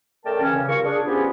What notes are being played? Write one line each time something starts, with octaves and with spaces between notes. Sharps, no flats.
C#3 A3 A#4 D5 G5 A5
C#3 E3 C#4
C#3
G2 F4 A#4 C#6
D4 G#4
F3 B3 C#4 F4 G4 G#4